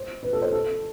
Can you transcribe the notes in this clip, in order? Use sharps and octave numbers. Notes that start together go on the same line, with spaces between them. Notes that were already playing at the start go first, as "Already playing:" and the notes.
Already playing: C5
B4
A4
C5
A4